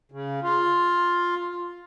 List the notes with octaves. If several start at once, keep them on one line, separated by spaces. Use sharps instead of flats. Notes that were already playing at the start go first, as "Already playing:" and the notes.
C#3
F4